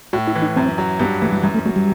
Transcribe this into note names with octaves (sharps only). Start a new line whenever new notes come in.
A2 F#4
E4
E3
D#4
F#2 C4
F#3
G2 B3
E3 A3
G3
F#2 G3
A3
F#3 A3
G3